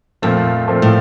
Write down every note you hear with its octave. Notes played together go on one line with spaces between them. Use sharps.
F2 A#2 F3 A3 C4
A#2 F3 A3 C4
A2